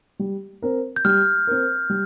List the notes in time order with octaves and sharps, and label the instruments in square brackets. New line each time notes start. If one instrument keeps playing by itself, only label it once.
[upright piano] G3
C4 A#4
[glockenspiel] G6
[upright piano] G3 [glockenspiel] F6
[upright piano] C4 A#4
G3